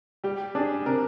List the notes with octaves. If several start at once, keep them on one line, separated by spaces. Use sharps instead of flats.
G3 G4
D4 G#4
C3 A#4